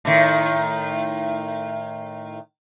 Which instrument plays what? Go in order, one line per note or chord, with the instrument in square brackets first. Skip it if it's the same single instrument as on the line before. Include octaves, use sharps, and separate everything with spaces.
[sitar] A2 D#3